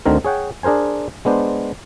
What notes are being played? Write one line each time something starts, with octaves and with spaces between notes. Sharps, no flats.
D2 D3 D#3 C4 A#4
G#4 C#5 F#5 G5
D4 G#4 A#4 C5 G#5
G#3 B3 D4 C5